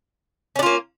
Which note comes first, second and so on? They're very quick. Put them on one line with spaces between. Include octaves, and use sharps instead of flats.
C#4 D4 F4 A#3